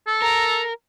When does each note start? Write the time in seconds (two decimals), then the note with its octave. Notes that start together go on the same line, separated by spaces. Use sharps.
0.07 A4
0.22 A#4 A#5